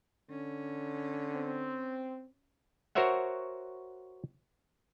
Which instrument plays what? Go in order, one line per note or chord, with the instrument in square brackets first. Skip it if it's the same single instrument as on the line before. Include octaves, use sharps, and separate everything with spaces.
[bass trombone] D3 [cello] C#4
[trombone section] C4
[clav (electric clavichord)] F#4 A#4 C5 C#5 E5 F#5